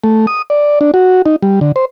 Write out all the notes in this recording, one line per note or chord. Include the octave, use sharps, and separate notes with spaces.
A3
D#6
D5
D4
F#4
D#4
G3
D3
C5